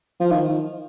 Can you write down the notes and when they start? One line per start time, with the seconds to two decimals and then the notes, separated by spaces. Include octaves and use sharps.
0.20 F3
0.31 D#3